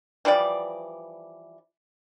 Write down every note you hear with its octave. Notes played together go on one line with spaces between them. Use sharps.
E3 F3 G3 D5